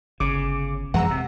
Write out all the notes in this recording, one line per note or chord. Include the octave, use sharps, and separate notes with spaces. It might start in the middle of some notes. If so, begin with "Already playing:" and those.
G1 C#3 D6
F2 E3 G#3 F#5 A#5 E6
C3